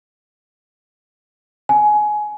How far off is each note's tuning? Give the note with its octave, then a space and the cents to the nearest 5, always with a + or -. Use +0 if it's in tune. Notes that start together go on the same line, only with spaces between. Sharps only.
G#5 +20